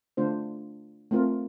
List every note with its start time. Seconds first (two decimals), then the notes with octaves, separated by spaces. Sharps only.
0.17 D3 A3 D4 F4 C5
1.11 A3 C4 F4 A#4